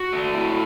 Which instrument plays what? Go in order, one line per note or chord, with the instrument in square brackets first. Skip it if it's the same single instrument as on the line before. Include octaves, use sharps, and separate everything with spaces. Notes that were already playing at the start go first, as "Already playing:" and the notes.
Already playing: [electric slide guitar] F#4
A3
A2